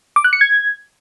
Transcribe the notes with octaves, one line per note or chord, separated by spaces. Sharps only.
D6
F#6
C#7
G#6